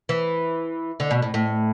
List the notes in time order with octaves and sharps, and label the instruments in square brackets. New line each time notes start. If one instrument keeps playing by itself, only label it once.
[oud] E3
D3
B2
A2
A2